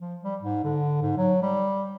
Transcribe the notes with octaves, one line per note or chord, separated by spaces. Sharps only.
F3
G3
G#2
D3
G#2
F#3
G3